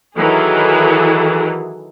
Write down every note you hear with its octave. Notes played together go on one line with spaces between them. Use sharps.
D#3 E3 F#3 G#4 A4